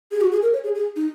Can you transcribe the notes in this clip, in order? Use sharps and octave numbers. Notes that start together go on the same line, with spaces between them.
G#4
F#4
G#4
A#4
C#5
G#4
G#4
D#4